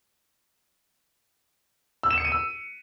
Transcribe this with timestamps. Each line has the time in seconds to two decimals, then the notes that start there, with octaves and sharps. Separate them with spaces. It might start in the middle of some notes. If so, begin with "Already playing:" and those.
2.03 E6
2.11 E7
2.18 C#7
2.25 D#7
2.32 E6